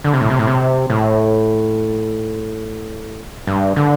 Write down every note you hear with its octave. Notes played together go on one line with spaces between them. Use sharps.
D3
C3
A2
C3
A2
C3
A2
G2
D3